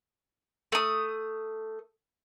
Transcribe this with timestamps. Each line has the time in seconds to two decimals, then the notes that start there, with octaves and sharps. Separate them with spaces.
0.72 A3 D#6